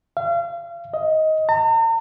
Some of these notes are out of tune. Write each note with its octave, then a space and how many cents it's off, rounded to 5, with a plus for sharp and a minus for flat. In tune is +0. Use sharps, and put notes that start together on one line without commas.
F5 -35
D#5 +15
A#5 -45